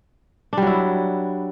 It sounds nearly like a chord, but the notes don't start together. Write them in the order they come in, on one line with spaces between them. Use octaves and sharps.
D4 G3 F#3 E4